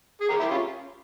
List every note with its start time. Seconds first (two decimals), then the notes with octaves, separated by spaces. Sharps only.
0.21 G#4
0.29 G4 A#4
0.40 E4 G4
0.51 C#4 F4